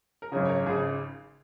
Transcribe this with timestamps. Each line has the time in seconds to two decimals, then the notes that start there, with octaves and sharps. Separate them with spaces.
0.22 A#4
0.32 G#1 F#2 C#3 C#5
0.45 C#5
0.49 A#4
0.66 G#1 C#3 G#4